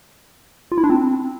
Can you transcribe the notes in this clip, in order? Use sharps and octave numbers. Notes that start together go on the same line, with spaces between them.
F4
E4
D4
C4